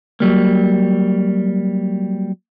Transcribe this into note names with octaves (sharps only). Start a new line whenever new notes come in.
F#3 G3 A#3